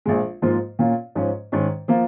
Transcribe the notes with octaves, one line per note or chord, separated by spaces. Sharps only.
A#1 A#2 G#3
G#2 F3 A#3 F4
A#2 A#3 C#4 F4
G#2 F3 C#4
G#2 D#3 C#4
F3 A#3 F4